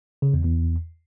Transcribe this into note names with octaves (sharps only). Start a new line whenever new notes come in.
C#3
E2
E2